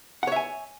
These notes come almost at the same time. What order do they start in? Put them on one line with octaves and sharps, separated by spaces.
F#5 C#5 E5 G#5